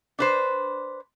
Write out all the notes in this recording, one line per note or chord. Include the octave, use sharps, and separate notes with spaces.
D4 B4 C5